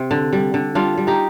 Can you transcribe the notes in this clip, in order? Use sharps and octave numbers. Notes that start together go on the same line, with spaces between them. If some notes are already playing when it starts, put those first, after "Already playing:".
Already playing: C3 C4
D3
G3
D3
G3 D4 F4
G3
D#4 G4